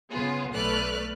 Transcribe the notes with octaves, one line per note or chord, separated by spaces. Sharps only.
C#3 B3 F4 G#4
B1 A3 B4 D5 F6 F#6